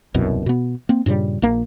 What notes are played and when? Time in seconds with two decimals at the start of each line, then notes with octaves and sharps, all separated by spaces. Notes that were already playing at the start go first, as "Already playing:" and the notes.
0.14 E1 C2 F#2 B2
0.46 B2 B3
0.89 A#3 C4
1.06 G2 A#2 C#3 G3
1.42 A#1 A#3